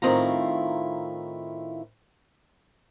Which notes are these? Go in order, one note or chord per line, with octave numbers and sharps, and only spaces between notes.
A2 D#3 C4 E4 F4 A#5